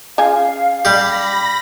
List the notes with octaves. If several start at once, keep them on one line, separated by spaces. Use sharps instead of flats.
C#3 F4 F5 G#5
G3 G4 B5 A#6